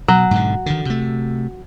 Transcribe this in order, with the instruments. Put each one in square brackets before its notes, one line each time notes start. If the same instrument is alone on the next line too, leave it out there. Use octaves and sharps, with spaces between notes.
[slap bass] B2 [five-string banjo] F#3
[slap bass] G#2 B2 D3
D3 D#3
C3 A3